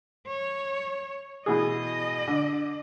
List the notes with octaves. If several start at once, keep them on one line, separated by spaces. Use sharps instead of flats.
C#5
B2 E3 G#4 D#5
D3